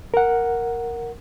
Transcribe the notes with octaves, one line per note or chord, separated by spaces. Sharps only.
A#4 F#5